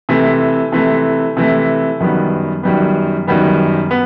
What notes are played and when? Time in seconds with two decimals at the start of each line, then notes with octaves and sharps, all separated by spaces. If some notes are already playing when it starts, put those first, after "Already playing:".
0.09 C3 E3 A3
0.72 C3 E3 A3
1.37 C3 E3 A3
2.00 F#2 D#3 G3 B3
2.63 F#2 D#3 G3 B3
3.27 F#2 D#3 G3 B3
3.91 B3